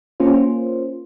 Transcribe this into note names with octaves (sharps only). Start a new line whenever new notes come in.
A#3 C#4 F4 C5